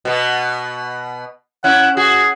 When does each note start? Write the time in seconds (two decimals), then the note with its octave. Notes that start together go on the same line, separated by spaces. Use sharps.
0.05 B2 B3
1.64 C#4 E4 F#5
1.97 F#4 G#4